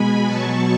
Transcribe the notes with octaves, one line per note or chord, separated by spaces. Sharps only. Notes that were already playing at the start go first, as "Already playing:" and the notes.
Already playing: B2 G#3 G#5 B5
B2 F#3 A5 C#6